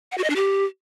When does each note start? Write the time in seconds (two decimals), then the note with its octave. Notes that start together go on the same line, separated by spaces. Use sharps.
0.12 F#5
0.18 F#4
0.24 D#5
0.30 D4
0.36 G4